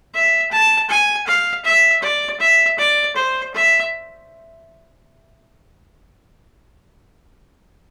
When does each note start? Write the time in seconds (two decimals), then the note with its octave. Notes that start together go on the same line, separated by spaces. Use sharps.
0.14 E5
0.51 A5
0.90 G#5
1.27 F5
1.65 E5
2.02 D5
2.40 E5
2.78 D5
3.16 C5
3.54 E5